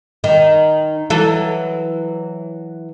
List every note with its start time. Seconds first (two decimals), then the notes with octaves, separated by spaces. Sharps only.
0.24 D#3
1.10 E3 F#3 A4